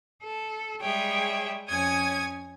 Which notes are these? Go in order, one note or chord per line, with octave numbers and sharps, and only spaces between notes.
A4
G3 G#3 G#4 C#5 E5 G5
F2 C#4 C#5 G#5 D#6 G#6